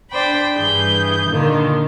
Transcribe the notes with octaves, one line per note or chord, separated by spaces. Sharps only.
D4 C5 D5 G5 B5
G2 E3 G#4 G6
A#2 D3 D#3 F4